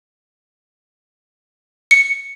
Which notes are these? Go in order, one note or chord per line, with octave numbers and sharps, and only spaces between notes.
C#7